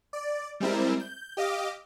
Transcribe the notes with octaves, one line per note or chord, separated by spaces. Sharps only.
D5
G3 G#3 C4 E4 A#4
G6
G4 D#5 F5 D6